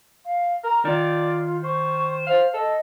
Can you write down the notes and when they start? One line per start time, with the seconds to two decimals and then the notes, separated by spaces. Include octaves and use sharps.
0.25 F5
0.64 A#4 A#5
0.85 D#3 F4 D5
1.63 C5 C#6
2.27 C5 F5
2.54 A4 D#5